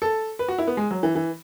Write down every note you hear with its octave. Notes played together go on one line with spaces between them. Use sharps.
A4
B4
F#4
E4
B3
G#3
F#3
E3
E3